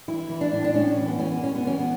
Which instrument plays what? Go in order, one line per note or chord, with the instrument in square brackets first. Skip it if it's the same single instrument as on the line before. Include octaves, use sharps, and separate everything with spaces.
[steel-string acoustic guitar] E3 E4
E3
D4
A2
D4
A2 C#4
E3
B3
E3 C#4
B3
E3 C#4
B3
E3 C#4
B3